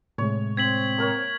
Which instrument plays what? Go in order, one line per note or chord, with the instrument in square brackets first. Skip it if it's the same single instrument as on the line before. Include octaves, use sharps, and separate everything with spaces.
[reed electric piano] A2 C3 G#3 [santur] C#5
[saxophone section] C4 [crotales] G#6 B6 F#7
[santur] A#3 A#4 C#5